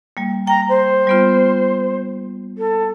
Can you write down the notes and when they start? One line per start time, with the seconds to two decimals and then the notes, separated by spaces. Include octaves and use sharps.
0.17 G3 A#3
0.47 G5 A#5
0.69 C5
1.07 G3 B3 F4
2.58 A4